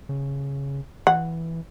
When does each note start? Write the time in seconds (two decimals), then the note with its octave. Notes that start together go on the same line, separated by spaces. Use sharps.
0.09 C#3
1.07 E3 F#5